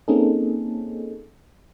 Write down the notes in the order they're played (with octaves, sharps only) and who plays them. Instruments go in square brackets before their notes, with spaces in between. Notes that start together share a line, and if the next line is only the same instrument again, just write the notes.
[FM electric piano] A#3 C4 C#4 D#4 G#4 A4